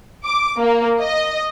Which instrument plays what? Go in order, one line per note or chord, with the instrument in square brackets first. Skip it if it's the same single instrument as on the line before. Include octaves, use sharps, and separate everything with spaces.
[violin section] D6
A#3
D#5